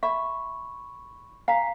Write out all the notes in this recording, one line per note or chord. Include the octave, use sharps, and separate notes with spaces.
E5 B5 C#6
F5 G#5 A#5 B6